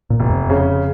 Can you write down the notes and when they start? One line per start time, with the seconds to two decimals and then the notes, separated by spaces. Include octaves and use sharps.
0.10 A#2
0.20 F1
0.30 F2
0.50 C#3